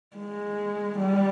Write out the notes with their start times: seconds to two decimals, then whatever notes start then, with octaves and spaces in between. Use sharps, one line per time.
0.16 G#3
0.99 G3